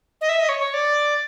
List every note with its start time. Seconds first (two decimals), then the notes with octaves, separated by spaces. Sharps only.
0.21 D#5
0.29 E5
0.39 D#5
0.49 C#5
0.59 C#5
0.74 D5